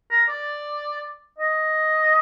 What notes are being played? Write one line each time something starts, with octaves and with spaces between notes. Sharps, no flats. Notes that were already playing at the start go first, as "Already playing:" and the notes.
A#4
D5
D#5